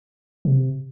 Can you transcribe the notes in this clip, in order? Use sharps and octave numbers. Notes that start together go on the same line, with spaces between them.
C3